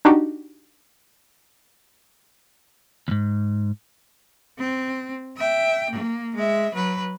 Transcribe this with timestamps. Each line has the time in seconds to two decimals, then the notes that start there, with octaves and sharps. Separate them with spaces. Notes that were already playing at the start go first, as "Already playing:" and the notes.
0.05 D4 D#4 F#4 G4
3.08 D#2 G#2
4.58 C4
5.37 E5 G5
5.90 A#3
6.35 G#3 E5
6.74 F#3 B4